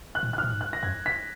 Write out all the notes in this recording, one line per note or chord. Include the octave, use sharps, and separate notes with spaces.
F#6
A#2
F#6
F6
A#2
G#2
F#6
A#6
F#2 G#6
B6